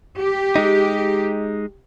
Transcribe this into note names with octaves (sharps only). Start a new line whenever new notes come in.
G4
G#3 D#4